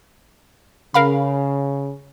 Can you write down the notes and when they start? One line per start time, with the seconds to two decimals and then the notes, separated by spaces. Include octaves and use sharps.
0.94 C#3 A#4 F5 B5